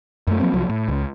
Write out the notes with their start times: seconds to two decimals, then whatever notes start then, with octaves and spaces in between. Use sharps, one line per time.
0.27 F#2 A3
0.40 F3 F#3 A#3 C4
0.53 C2 F3 F#3
0.69 A2
0.89 C#2